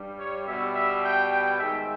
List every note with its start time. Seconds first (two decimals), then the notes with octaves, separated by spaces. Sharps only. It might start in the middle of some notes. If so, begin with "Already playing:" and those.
Already playing: G2 G3
0.19 C#5
0.47 B2 G3 E5
0.75 E5
1.04 G5
1.31 G5
1.59 G#2 D#3 G#3 E5